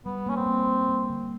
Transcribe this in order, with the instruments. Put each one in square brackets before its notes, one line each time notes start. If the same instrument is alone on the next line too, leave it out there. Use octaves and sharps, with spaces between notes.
[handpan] G3 [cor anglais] B3
[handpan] A#3 [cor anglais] C#4
[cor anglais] C4
[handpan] A#3
A#3
A#3
D3